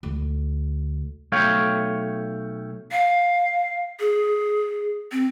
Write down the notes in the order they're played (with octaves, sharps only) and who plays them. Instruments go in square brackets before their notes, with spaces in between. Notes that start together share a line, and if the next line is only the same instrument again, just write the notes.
[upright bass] D2
[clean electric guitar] B1 A3 C#5 F5 G5
[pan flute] F5
G#4
C4